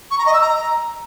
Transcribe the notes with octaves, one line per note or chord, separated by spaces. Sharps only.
C#6
A#5
D#5
E6
A#5